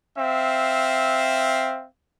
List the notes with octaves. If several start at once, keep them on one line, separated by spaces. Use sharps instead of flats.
C4 E5 F5